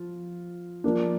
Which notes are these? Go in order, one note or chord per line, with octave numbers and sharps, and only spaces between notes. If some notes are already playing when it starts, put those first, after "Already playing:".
Already playing: F3 F4
F3 A#3 D4